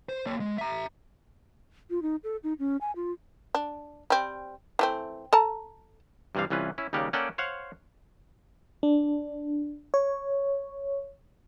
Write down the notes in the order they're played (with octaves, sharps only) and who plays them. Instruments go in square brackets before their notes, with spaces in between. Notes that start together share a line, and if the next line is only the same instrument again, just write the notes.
[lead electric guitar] C5
A#3 C#5
G#3
E5 A#5
[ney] F4
D#4
A4
D#4
C#4
G#5
F4
[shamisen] D4
G3 C4
E3 A3 C4
A4 A5 A#5
[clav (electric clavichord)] G2 C3 E3 G3 F5
C2 E3 C#4 F4 B4
C#4 E4
D#2 C#3 G3 A#3 G4 F#5
A#3 C#4 A4 D5 F#5 G5
C5 C#5 F5 F#5
[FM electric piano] D4
C#5